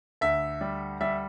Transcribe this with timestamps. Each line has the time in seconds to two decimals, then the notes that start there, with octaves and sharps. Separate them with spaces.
0.21 D2 E5
0.61 G3
1.01 G3 E5